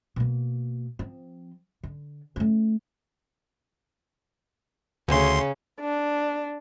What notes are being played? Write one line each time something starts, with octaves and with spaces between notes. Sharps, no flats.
B2 A#3
F3 C4
D3
A3 C#4
D2 C#3 C6
D4